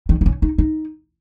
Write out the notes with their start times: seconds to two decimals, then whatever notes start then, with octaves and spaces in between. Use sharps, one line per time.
0.09 D#3
0.21 D#4
0.26 C#4
0.42 D#4
0.58 D#4